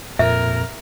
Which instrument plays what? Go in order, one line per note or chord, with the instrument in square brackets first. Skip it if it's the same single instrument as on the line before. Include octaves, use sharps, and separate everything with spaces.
[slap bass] F2 [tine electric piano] A#2 [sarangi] A#4 [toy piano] E5